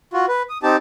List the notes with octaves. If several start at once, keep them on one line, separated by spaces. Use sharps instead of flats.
F4 F#4
B4
D#6
C4 D#4 G4 A5